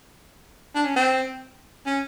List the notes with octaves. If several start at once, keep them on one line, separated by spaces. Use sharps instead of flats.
D4
C#4
C4
C#4